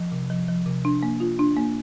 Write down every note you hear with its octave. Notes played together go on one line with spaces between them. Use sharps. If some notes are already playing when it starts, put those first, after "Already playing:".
Already playing: F3
C3
F3
F3
C3
D4
A#3
F4
D4
A#3